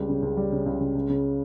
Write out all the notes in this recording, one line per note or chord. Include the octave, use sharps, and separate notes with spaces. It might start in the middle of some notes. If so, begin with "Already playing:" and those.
Already playing: C#2 G3
C#3
C#2
G3
C#3
C#2
C#3
C#2
C#3